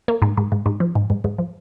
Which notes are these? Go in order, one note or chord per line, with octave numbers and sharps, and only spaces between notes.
A#3
G#2
G#2
G#2
G#2
F3
G#2
G#2
G#2
F3